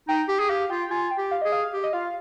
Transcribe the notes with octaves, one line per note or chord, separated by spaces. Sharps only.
D#4 G5
G4 G5
G#4
G4 F5
F4 G5
F4 G#5
G5
G4
F5
G#4 D#5
F5
G4
D#5
F4 F5